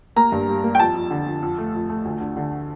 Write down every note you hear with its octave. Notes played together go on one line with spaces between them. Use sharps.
A#3 A#5
G2
G3
A#3
G5
F2 A5
F2
D3
F2
F2
A3
F2
A3
D2
D3
D3